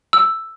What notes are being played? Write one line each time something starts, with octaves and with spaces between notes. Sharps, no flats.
E6